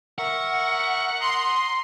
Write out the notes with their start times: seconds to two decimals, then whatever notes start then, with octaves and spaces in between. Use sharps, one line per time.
0.19 A#4 E5 F#5 C#6
1.21 A#5 C6 D#6